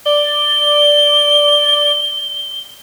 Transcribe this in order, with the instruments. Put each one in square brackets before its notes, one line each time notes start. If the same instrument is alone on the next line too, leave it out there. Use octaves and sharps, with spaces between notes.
[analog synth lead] D5 [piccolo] G7